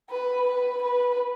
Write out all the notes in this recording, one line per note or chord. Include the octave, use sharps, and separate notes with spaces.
B4
B4
B4